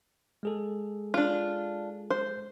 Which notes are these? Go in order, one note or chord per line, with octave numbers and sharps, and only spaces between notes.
G#3 G#4 A4
D4 F4
C5